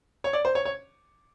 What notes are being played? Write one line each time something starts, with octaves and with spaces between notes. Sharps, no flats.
C#5
D5
C5
C#5
C#5